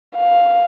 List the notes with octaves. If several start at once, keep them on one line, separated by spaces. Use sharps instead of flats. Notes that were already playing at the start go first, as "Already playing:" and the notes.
F5